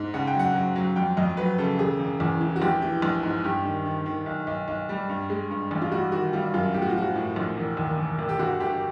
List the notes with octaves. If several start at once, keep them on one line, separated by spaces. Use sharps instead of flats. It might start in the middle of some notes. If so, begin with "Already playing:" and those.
Already playing: G#2
C#3 F#5
G5
F#3 F#5
F#3
F#3
F2 G5
F2 D#5
F#3 B4
C#3 A4
E1 G#4
E1
E2
E3
F#4
A#1 G4
E3
A#1
G#2
G2 G4
D#3
D#3
D#3
B1
B1
B1
G3
G2
G#3
G2
A1
F4
G3 F#4
D#3 F#4
G3 F4
F#2 F4
A2 G4
F#4
F4
F3 F#4
A2
A#1
E1
D#2
E1
E1
G4
G1 F#4
G1 G4